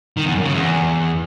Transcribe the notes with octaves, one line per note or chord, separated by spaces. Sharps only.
D#3
E2
F#2
C#3
E2